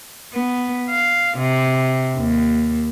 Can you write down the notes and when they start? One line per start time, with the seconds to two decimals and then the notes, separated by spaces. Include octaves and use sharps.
0.34 B3
0.90 F5
1.38 C3
2.17 D#2